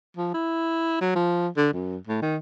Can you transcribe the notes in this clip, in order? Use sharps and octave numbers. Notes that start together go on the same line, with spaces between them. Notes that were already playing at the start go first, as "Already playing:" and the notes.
F3
E4
F#3
F3
D3
F#2
A2
D#3